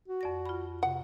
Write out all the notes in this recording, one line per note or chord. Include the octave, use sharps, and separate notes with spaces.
F#4
F2 D5 A#6
F4 B5
C3 F#5